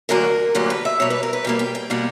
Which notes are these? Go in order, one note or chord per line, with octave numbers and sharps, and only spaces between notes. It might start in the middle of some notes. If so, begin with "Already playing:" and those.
D2 D3 F#3 A#3 A#4
D2 D3 F#3 A#3 G4
B4
E5
B2 G3 A#3 C#5
B4
A#4
B4
B2 G3 A#3 G5
G5
G5
B2 G3 A#3 F#5